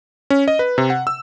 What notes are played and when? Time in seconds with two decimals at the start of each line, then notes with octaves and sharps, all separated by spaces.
0.30 C#4
0.48 D#5
0.59 B4
0.78 C3
0.90 F#5
1.07 E6